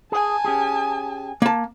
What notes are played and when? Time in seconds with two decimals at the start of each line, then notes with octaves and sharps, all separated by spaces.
0.12 G#4 G#5 A5
0.45 C#4 G4 G#4
1.42 A#3 A5